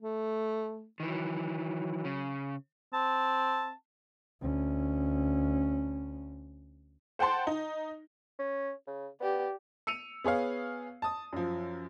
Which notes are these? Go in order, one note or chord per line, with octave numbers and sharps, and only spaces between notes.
A3
D#3 E3 F#3
C#3
C4 A5
D2 C#4
C5 F#5 G5 A5 C6
D#4
C#4
C#3
B3 G4 D5
E6 C#7 D#7 F7
B3 G#4 C#5 F5
A5 D#6
F#2 F3